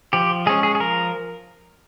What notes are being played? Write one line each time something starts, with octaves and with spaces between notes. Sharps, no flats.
F3 G4
G#3 C#4 G#4
G#4
G#4
F3 A#4